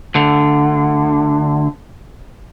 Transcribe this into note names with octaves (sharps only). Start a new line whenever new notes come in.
D2 D3